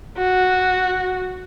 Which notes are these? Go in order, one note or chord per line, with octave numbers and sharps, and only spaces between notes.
F#4